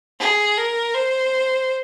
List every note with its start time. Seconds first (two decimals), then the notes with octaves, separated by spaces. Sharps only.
0.20 G#4
0.57 A#4
0.94 C5